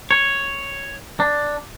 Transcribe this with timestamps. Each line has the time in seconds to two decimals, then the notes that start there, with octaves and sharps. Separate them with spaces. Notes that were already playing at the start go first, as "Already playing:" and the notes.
0.11 C#5
1.20 D4